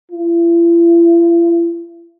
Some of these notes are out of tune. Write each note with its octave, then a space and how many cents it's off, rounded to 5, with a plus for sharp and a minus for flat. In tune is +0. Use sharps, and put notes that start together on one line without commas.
E4 +45